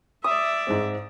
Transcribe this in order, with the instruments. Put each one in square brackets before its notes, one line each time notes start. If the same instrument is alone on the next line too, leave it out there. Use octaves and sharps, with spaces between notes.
[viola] D5 E5 [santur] D#6
[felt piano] G#2 G#3 C4